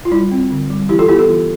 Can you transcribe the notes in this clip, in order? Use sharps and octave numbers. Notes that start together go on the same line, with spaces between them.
F4
G3 E4
C4
D3
G3
E3 E4 G4
F4 A4
B3 E4 G4
F4 A4
E3